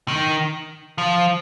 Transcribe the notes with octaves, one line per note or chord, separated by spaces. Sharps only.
D#3
F3